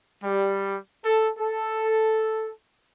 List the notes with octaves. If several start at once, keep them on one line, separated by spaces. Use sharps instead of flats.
G3
A4
A4